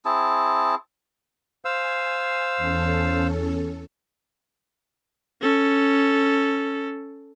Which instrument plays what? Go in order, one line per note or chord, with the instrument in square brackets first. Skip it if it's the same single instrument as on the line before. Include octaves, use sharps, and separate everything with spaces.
[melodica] C4 E4 G#4 A5
[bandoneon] C5 F5 E6 [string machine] G#5
[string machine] E2 C#4 A4
[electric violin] C#4 A4